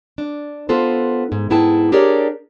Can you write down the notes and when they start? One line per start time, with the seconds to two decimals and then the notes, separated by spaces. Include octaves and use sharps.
0.18 D4
0.69 B3 F4 A4 C5
1.32 G#2
1.50 G#2 B3 E4 G#4 G5 A5
1.92 D4 G4 G#4 A#4 C#5 D5